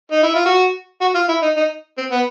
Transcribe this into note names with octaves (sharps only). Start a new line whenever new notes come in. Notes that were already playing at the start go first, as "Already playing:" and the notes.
D#4
E4
F4
F#4
F#4
F4
E4
D#4
D#4
C4
B3